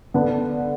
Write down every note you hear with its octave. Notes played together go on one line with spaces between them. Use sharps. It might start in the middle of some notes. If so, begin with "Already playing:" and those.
D3 B3 D4 B4